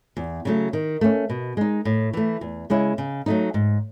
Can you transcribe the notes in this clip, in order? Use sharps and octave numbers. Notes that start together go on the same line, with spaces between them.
E2
C#3 F#3 A3
D#3
A3 C#4
B2
G#3 D#4
A2
E3 A3
E2
C#3 G#3 C#4 E4
C#3
F#3 A3 D#4
G#2